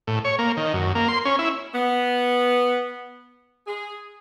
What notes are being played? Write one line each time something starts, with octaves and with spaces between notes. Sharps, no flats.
A2
C#5
A#3
D#3
F#2
A#3
C6
C#4
E4
B3
G#4